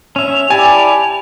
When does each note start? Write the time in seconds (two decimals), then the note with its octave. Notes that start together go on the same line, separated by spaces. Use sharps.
0.16 C#4 E5 F7
0.50 E4 G4 D5 G#5 A5